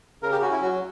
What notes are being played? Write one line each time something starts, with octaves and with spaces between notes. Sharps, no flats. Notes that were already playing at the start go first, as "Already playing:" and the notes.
C#3 A#4
G4
C#4 F#4
E4
F#3 F#4